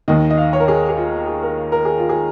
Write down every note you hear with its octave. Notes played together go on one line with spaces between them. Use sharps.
D#2 D#3 D#5
D#5
F5
C#5
A#4
G#4
G#4
F4
G#4
A#4
A#4
G#4
F4
G#4